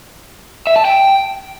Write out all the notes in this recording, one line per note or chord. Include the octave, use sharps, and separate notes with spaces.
E5
A5
G5